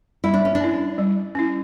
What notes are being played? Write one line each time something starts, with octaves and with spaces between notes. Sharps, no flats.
G3 E4
D4
C#4
D4
C#4 E4
G3
C#4 E4